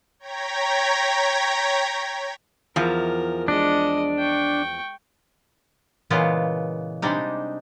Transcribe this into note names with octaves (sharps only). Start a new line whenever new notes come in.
C#5 G5 A#5 G#6 A#6 B6
E2 F3 A#4
G#3 D4 D#5
G5 C#6
A#2 C#3 E3 G#3 B3 F4
C3 G3 G#3 D4 D#4